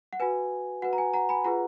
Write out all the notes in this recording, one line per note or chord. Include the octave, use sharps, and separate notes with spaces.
F#5
F#4 B4 G#5
F#4 B4 F#5
A#5
G#5
F#5 A#5
G#5 B5
F4 G#4 B4 F#5 A#5